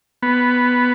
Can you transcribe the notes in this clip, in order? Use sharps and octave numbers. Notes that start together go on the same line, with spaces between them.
B3